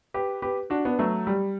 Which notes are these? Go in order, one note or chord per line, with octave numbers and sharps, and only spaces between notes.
G4 B4
G4 B4
D4 F#4
B3 D4
F#3 A3
G3